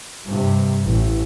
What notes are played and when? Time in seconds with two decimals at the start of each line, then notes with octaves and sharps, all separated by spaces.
0.24 G2 C3
0.83 A1